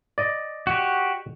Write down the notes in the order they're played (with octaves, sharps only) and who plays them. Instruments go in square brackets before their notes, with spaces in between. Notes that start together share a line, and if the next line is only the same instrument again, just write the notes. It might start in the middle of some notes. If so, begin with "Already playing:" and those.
[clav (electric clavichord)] D5 D#5
[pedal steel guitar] F#4 G4